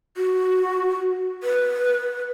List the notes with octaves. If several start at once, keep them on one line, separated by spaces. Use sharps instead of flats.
F#4
B4